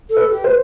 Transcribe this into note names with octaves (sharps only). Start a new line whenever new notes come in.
A4
B4
G4
B4 C5